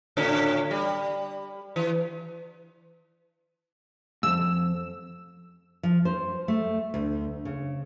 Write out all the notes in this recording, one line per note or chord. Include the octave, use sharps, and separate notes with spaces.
A2 D3 C#4
G3
E3
F2 G#2 E6
F3
C5
A3
D2
C#3